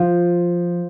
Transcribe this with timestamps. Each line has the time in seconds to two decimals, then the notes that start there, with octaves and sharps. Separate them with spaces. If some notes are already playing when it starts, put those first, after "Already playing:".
Already playing: F3